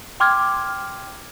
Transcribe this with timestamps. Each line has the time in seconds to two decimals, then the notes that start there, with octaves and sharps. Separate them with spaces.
0.20 G5 C6 D6 F6 G#6